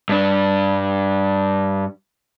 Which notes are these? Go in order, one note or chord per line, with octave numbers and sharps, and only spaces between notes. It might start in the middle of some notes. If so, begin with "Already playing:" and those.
G2 D4